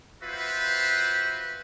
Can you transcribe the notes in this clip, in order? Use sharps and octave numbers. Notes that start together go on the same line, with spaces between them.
F4 F#4 B4 C5 E5